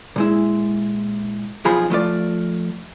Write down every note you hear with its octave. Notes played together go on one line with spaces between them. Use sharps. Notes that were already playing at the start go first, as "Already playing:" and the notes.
A#2 G#3 E4
B1 F2 F3 F4 G#4 B5
F3 A3 F4 D5